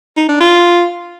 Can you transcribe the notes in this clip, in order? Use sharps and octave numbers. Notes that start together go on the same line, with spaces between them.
D#4
D4
F4